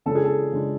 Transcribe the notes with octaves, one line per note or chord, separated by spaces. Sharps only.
C#3 G#3 D4 A4
G#4
A4
C#3 G#3 D4